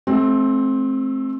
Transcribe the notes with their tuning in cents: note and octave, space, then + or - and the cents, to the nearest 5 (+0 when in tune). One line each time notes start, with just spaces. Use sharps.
A3 -30 C4 +15